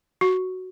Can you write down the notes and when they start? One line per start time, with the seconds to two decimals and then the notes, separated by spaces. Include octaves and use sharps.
0.21 F#4